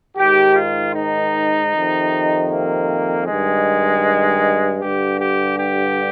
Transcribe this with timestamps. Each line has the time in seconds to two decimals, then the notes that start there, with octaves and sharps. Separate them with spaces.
0.17 G#2 D#3 G4
0.55 F4
0.95 D#4
1.72 F2 C3 D#3
2.50 A#3
3.26 G2 D#3 G#3
4.82 G2 D3 G4
5.20 G4
5.58 G4